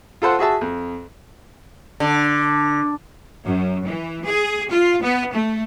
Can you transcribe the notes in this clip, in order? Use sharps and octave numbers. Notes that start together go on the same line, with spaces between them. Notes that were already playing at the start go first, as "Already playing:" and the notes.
F4 A4 C5 F#5
F#4 G#4 E5 A5
F2
D3
F#2
E3
G#4
F4
B3
A3